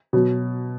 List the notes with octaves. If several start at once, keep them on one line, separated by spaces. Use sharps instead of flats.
B2 F#3